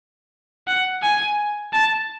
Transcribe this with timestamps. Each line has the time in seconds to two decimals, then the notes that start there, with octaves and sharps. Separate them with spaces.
0.67 F#5
1.02 G#5
1.73 A5